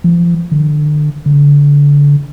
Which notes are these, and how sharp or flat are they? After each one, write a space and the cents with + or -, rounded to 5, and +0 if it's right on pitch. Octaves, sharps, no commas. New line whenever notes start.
F3 -30
D3 +30
D3 -30